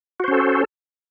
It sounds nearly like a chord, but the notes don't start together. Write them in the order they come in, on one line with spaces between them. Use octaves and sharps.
F#4 C5 C#4 A4